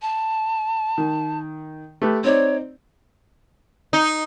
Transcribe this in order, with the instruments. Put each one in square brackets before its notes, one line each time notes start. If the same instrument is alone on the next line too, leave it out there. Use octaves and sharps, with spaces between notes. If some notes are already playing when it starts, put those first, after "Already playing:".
[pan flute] A5
[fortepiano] D#3
A3 G4 B4
[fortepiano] C4 D#4 D5 [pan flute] C#5
[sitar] D#4